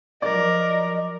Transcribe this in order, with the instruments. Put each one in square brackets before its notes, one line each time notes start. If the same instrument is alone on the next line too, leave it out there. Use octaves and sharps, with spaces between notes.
[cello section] F3 F#3 [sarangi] A#4 [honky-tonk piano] D5 [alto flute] D#5